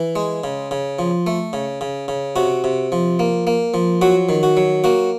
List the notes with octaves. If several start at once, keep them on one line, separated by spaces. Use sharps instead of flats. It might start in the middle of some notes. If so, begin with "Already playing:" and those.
Already playing: E3
G#3
C#3
C#3
F3
A3
C#3
C#3
C#3
C3 F#4
C3
F3
A#3
A#3
F3
F#3 F#4
D#3
F#4
F#3
A#3 F#4